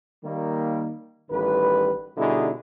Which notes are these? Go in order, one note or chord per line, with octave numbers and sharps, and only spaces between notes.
D#3 G3 A#3
A1 D#3 G3 B4
B2 D3 G3 D#4 E4 G#4